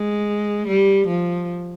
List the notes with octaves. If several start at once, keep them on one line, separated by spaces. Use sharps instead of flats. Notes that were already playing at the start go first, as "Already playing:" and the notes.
Already playing: G#3
G3
F3